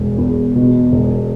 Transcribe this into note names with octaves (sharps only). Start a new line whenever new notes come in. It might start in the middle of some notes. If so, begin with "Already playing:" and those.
Already playing: E1
E2
B2
E1